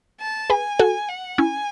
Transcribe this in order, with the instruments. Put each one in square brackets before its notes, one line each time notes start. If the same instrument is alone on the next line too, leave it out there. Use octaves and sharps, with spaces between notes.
[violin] A5
[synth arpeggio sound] G#4 B4 [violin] G#5
[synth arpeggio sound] F#4 A4
[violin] F#5
[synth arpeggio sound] C#4 E4 [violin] G#5